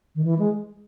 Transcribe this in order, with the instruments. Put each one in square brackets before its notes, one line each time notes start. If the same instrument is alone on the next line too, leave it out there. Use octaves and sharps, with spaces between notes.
[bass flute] D#3
E3
G#3